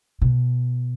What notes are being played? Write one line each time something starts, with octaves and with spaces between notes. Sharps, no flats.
B2